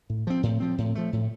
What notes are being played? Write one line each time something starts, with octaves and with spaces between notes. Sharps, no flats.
A2
F3 C4
A2
F3 C4
A2
F3 A3
A2